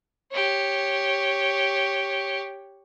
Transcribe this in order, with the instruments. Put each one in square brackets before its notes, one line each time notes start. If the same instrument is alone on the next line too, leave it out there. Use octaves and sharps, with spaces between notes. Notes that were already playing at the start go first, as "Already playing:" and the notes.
[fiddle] G4 C#5